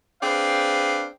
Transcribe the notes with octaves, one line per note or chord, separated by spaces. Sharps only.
C4 D4 G#4 B4 F5